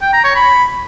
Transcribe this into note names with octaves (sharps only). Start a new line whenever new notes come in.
G5
A#5
C#5
B5